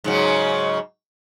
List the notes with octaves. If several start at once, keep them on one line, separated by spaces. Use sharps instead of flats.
G#2 C#3 F#3